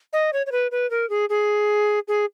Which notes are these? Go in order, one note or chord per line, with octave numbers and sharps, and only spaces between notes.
D#5
C#5
C#5
B4
B4
A#4
G#4
G#4
G#4